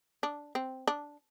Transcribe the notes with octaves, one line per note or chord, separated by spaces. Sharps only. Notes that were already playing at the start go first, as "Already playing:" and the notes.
D4
C4
D4